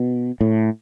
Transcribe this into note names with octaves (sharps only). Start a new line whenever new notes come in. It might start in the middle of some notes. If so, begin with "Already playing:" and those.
Already playing: B2
A2